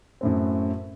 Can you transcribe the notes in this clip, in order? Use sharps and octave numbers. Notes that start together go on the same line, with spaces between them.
F#2 A2 C4